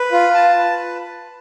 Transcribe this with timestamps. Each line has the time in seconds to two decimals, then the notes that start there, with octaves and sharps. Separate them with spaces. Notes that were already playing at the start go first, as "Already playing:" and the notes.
Already playing: B4
0.12 F4
0.34 A5
0.58 B4